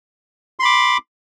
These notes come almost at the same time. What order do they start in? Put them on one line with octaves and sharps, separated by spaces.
C6 B5 D6